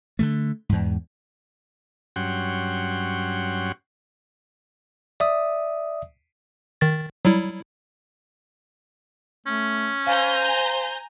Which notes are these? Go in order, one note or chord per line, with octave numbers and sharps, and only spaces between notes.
D3 D#3 A3
E2 G#2
G2 F#3 C#4 F#5 G5 C6
D5 E5 D#6
D#3 A6
F#3 G3 E4
A3 C#4
C5 F5 G#5 A#5 G6